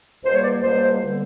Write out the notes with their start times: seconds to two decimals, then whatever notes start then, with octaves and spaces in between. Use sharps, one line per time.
0.24 C#2 B2 G3 A#3 C5
0.34 C#5
0.43 D5
0.62 C#2 B2 G3 A#3 C5
1.02 D3 G3 B3